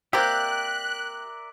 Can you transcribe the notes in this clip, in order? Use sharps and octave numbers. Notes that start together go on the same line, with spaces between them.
A#3 C4 G4 A#4 D5 E5 F#6